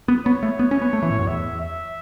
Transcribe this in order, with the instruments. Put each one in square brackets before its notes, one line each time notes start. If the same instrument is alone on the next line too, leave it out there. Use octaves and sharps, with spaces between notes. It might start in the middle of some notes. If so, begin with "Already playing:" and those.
[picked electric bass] B3
[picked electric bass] B3 [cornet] C#5
[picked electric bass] A3
B3
C#4
B3
A3
E3
A2
F#2
[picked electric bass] E2 [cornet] E5
[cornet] E5